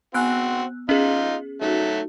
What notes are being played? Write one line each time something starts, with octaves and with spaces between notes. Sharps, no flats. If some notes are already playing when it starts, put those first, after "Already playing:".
B3 C4 F#4 G#5 E6 F#6
C#4 D#4 F4 G#4
F#3 A3 D#4 F#4 E5